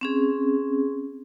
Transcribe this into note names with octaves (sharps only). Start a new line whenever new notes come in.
C4 C#4 G#4